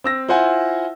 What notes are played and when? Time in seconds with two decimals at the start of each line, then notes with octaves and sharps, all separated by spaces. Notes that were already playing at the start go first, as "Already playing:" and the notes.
0.04 C4 E6 A#6
0.28 E4 F4 C5 F#5 G#5